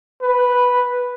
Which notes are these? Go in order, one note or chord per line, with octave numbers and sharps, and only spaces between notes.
B4